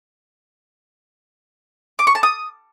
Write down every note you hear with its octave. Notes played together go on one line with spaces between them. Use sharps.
D6
C#6
A5
D#6